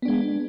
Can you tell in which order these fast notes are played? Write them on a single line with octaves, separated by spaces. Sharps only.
B3 D4 G#3